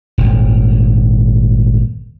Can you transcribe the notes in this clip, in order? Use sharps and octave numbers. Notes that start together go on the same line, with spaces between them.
D#1 G#1